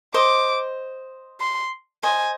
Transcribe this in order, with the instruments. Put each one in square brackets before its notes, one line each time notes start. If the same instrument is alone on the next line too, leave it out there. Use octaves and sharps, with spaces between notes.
[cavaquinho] C5 D#5 [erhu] D6
[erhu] C6
[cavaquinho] C5 D#5 [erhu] G#5